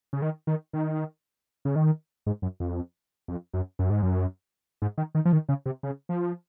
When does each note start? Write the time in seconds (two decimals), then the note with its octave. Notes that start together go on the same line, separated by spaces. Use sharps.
0.13 C#3
0.22 D#3
0.47 D#3
0.73 D#3
1.65 C#3
1.75 D#3
2.26 G#2
2.42 F#2
2.60 F2
3.28 F2
3.54 F#2
3.79 F#2
3.90 G#2
4.02 F#2
4.82 G#2
4.98 D#3
5.15 D#3
5.25 F3
5.33 D#3
5.49 C#3
5.66 C3
5.83 C#3
6.09 F3